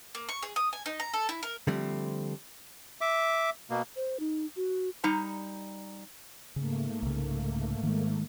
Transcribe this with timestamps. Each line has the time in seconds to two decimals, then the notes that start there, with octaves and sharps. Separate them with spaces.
0.15 A#3
0.29 C#6
0.43 G#4
0.56 D#6
0.73 G#5
0.86 D#4
1.00 A#5
1.14 A4
1.29 E4
1.43 A#4
1.67 D3 F3 G3 A3 C4
3.01 E5 D6
3.70 B2 A#3
3.96 C5
4.20 D#4
4.56 F#4
5.04 G3 D#4 A#5
6.56 G#2 C#3 A3 A#3
7.02 C2 C#3
7.83 D#3 G#3